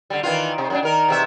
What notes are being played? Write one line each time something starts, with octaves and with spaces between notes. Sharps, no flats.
D3 G3
D#3 E3 F4
C3
F#2 A#2 D4
D#3 A#4
E2 C3 E5